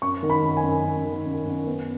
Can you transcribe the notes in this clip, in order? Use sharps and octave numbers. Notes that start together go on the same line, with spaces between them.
F#2 C#6
D#3
B5
F#2
G#5
F#2
F#2
D#3
F#2
F#2
B3